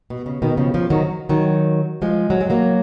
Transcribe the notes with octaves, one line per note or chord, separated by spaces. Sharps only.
B2
C#3
B2 D#3
C#3 F3
C#3 F3
D#3 F#3
D#3 F#3
F3 G#3
F#3
G#3
F#3 A#3